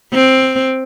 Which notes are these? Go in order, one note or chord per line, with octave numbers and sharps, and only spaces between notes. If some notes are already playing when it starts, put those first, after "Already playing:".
C4